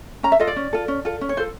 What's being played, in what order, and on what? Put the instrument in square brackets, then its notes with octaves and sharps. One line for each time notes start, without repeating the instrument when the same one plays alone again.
[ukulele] C#4 A#5
E5
F4 A4 D#5
D5
C#4
F4 A4
C#4
F4 A4
C#4
C#5
F4 A4 C5